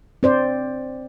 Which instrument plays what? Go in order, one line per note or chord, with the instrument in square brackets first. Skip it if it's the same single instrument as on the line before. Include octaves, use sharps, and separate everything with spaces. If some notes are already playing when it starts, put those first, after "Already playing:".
[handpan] C4 C5 D5